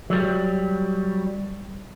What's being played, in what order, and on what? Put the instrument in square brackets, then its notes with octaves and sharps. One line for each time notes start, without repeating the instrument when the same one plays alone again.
[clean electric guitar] F#3 G3